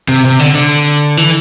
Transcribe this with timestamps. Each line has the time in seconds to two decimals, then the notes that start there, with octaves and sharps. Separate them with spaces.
0.08 C3
0.25 C3
0.39 D3
0.55 D3
1.17 E3